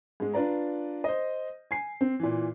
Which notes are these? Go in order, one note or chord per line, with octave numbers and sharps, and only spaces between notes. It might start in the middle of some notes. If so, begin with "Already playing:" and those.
G#2 G#3
D4 F4 B4 D5 A#5
C5 D#5
G#5 C7
C4
A#2 E3